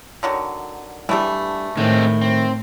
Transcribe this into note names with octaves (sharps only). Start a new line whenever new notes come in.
D3 D#3 F#3
G2 E3 G3 A3
A2 D#3 G#3 C4
C4